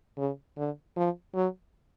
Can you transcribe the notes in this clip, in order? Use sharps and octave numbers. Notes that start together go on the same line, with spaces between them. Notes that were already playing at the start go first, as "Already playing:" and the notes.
C#3
D3
F3
F#3